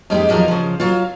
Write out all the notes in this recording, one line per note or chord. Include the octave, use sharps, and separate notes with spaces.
F2 G#3 C4 D#4 G4
E2 F3 F#3 A#4
C#3 F3
F#3 F4